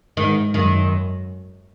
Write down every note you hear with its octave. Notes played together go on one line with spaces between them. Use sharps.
G#2 D#3
F#2 D#3